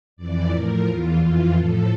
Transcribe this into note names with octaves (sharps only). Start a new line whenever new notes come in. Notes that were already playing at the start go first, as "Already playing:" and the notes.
F2 E3 D5
A2 F3 A#4
E2 E3 F4
F2 E3 F4
A2 F3 A4